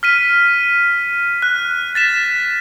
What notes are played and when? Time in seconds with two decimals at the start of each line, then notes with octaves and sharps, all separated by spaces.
0.03 F6 B6 D#7
1.42 F#6
1.95 A6 B6 E7